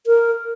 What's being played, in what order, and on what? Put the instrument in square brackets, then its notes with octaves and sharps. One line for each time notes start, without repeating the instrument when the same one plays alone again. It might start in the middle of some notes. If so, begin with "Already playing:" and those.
[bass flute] A#4